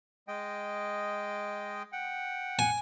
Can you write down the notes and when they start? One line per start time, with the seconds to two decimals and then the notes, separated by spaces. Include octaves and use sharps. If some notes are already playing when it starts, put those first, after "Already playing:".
0.28 G#3 D#5 G5
1.92 F#5 G5
2.59 G#5